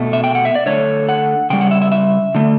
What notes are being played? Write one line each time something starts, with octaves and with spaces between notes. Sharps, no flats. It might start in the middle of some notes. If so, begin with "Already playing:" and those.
Already playing: B2 A3
E5
G5
F#5
E5
D5
D3 A3 C#5
F#5
C#3 G3 G5
F#5
E5
E5
E5
D3 A3